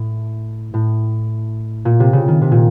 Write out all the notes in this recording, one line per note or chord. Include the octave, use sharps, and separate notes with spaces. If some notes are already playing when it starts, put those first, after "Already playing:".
Already playing: A2
A2
A#2
C3
C#3
D#3
C3
A#2